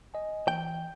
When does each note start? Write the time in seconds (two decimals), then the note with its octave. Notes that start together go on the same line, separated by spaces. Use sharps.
0.14 D#5 G#5
0.48 E3 G5